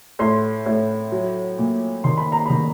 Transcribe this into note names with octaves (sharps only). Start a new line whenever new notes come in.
A2 C6
A2
F#3
A#2
D#3 C6
B5
A#5
D#3 B5